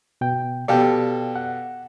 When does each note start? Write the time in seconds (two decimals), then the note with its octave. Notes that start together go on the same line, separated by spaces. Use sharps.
0.21 B2 G5
0.68 B2 G4 A4 D5 F5 G5
1.36 F#5